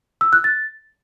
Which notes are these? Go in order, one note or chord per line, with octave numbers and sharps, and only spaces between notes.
E6
F#6
A6